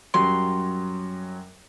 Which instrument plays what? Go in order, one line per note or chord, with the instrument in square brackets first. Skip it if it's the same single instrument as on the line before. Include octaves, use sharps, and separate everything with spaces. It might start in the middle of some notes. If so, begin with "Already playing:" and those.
[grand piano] F#2 F#3 G3 [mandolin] C6